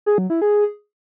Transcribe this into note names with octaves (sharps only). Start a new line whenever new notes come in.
G#4
F#3
E4
G#4